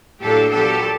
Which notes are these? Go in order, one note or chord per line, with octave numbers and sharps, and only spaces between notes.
A2 F#3 A#3 D4 G4 A4
A#2 F#3 B3 G4 A4